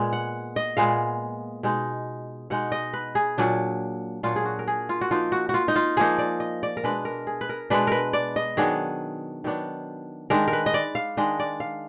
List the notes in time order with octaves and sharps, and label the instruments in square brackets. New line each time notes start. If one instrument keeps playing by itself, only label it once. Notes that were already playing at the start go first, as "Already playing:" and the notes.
Already playing: [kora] A#2 G#3 B3
F#5
D#5
A#2 G#3 B3 F5
B2 G#3 D#4
B2 G#3 D#4 F#5
D#5
B4
G#4
A#2 F#3 D4
A#2 F#3 D4 F4
G#4
F#4
A#4
G#4
F4
F#4
F3 A#3 D#4 F4
F#4
F#4
F4
D#4
F4
F3 A#3 D#4 G#4
D5
D#5
D5
A#4
B2 G#3 D4 B4
A#4
G#4
B4
A#4
B2 G#3 D4 B4
A#4 B4
D5
D#5
D#3 F#3 B3 D4 G#4
D#3 F#3 B3 D4
D#3 G#3 D4 A#4
A#4
B4
D#5
D5
F5
D#3 G#3 D4 D#5
D5
F5